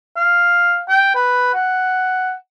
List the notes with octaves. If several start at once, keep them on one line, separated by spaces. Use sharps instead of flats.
F5
G5
B4
F#5